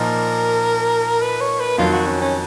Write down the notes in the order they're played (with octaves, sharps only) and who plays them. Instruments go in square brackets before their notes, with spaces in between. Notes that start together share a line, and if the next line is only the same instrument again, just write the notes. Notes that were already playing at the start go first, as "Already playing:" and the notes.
Already playing: [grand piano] A#2 F3 A#3 D#4 [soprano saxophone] A#4
[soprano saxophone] B4
C#5
B4
[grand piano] F2 D#3 F#3 [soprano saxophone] F4
[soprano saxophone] F#4
C#4
C#4